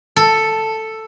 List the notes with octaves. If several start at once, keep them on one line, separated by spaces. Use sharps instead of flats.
A4